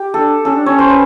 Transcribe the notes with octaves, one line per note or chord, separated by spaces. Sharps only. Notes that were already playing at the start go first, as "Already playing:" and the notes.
Already playing: G4
D4 A4
C#4 A4
D4
C#4 C#5
C5
B4